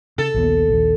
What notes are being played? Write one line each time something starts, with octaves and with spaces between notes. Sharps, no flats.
C#3 A4
A#1 D#2 B3
A#1 D#2